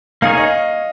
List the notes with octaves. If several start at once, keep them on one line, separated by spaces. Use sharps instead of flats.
A#3 D#4 G#4 C#5 F5
D#5